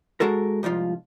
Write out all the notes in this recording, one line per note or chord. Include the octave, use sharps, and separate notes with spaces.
G#3 F#4 A4 A#4
C2 G#2 F3 F4